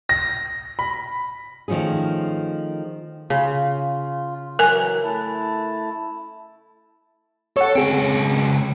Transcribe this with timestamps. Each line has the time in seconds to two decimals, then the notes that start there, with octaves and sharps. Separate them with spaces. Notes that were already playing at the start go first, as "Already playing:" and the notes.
0.09 A#6
0.79 B5
1.68 D#3 F3 A3 C#4 G#4
3.30 C#3 F4
4.59 E3 F#3 A#4 G#5
5.04 A3 E4 A5
7.57 A4 C#5 F#5
7.75 C#2 C4 G#4 G5